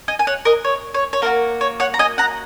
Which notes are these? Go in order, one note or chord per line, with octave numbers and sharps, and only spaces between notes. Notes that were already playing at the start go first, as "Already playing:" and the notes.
D#5 G#5
G#5
C#5 F#5
A#4 D#5
C#5
C#5
C#5
A#3 D#4 F#4 A#4
C#5
C#5 F#5
A#5
D#5 G#5
F#5 A#5